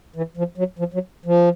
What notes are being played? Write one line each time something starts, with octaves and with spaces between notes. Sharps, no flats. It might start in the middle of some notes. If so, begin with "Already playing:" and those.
E3
F3
F#3
F3
F#3
F3